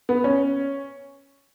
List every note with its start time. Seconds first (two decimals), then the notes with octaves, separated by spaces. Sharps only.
0.09 B3
0.24 C#4